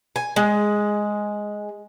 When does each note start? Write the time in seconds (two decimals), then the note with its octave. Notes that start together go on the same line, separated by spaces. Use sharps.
0.16 G#5
0.36 G#3